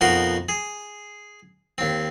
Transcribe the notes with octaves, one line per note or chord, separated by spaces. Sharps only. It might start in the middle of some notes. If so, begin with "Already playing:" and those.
F2 B2 D#4 F#4 A#4 C6
G#4
D#2 C4